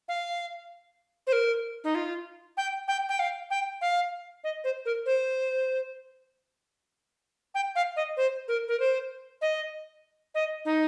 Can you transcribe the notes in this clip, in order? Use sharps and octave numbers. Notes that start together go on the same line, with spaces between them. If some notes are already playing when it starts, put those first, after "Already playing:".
F5
C5
A#4
D#4
F4
G5
G5
G5
F5
G5
F5
D#5
C5
A#4
C5
G5
F5
D#5
C5
A#4
A#4
C5
D#5
D#5
D#4